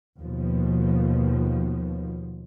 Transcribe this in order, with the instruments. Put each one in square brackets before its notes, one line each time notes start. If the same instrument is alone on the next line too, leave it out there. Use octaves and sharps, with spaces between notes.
[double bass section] D#2 B2 F3